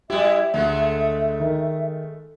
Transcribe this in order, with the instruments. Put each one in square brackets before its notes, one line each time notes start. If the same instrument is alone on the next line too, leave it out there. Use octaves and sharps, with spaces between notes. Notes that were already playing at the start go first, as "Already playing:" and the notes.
[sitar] G3 E4 [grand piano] G4 [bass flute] E5
[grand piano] D2 [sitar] G#3 A3
[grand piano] D#3